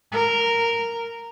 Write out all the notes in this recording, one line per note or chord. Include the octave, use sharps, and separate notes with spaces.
A#4